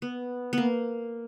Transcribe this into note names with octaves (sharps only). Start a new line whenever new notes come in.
B3
A#3 B3